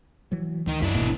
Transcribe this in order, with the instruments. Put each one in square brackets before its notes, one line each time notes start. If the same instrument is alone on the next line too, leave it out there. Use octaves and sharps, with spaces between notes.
[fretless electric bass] E3 F#3
[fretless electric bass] C#2 [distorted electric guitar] D#3 A#4
[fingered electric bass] F#2 [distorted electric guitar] D4 E4
[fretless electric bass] D#1 G#2 A#3 [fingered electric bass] G#1 B2 E3